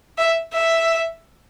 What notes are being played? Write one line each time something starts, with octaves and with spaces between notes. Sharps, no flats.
E5
E5